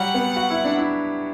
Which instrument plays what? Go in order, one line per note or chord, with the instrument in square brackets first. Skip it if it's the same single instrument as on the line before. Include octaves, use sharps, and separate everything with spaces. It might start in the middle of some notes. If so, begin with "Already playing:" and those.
Already playing: [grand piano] F#3 G3 [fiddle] F#5
[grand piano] B3
F#4
E4
D4
E4